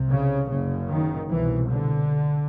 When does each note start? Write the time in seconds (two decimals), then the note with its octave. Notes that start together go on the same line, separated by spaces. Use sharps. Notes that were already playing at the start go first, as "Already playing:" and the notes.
Already playing: C2 C3
0.09 C#3
0.49 F#1 F#2 C#3
0.88 D#3
1.28 C2 B2 E3
1.68 D3